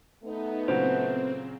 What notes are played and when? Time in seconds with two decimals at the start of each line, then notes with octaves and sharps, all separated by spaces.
0.23 A3 B3 D#4
0.68 A#2 C#3 F#3 C4 C5